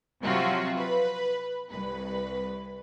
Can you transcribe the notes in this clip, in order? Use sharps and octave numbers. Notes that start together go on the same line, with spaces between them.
C3 F3 F#3 C4 F4 F#4
B4
C2 B4